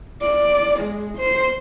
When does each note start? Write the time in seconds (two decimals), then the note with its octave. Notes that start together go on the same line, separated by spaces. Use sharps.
0.22 D5
0.79 G#3
1.18 C5